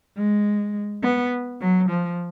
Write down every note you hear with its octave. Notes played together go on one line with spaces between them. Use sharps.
G#3
B3
F#3
F3